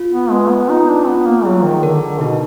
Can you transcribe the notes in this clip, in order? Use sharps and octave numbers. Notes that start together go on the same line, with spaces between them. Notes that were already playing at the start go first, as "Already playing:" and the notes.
Already playing: F4
B3
G#3 B4
B3
D#4 F4
D4
B3 F4
A#3
F#3 G#4
D#3
D3 A#4
D3
B2 D#4